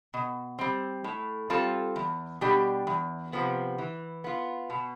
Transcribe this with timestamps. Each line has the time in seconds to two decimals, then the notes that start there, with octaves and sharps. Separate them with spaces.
0.14 B2
0.59 G3 C4
1.04 A2
1.50 G3 C4 F4 A4
1.96 E2
2.41 B2 G3 D4 G4
2.87 E2
3.33 C3 F3 B3
3.78 E3
4.24 B3 F4
4.70 B2